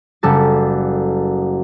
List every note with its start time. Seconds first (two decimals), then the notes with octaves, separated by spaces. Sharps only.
0.23 F#1 G3 A4 A5 A6